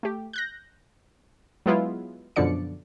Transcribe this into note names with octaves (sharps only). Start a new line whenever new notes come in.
A3 G4
F#6 G6 A#6
F#3 G#3 B3 E4 F4
F#2 B2 D3 F3 D5 C#7